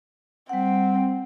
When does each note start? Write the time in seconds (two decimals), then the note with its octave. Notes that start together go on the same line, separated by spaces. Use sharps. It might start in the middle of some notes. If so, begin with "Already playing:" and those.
0.49 G3 C4 F#5